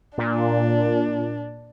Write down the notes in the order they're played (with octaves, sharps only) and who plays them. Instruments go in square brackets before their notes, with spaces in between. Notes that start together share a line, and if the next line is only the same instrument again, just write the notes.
[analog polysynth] A#2 [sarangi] D4